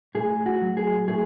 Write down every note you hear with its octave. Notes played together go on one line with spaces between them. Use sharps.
A2 G#4
F#4
F#3
G#4
A2 G#4